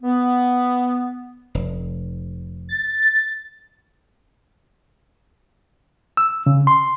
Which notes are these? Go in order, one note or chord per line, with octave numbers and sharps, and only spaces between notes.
B3
F1
A6
E6
C#3
C6